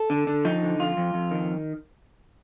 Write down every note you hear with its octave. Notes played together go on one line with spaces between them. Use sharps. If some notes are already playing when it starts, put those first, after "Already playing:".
Already playing: A4
D3
D3
F3 D#4
D3
F2 F4
F2
F2
D#3